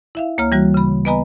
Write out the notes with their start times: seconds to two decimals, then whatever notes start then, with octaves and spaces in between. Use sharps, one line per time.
0.15 E4 E5 F5
0.38 D2 A#3 C#5 A#5 F6
0.52 E3 G3 F#4
0.74 C#3 B5
1.05 B3 B4 D#5 G#5 A#5 B5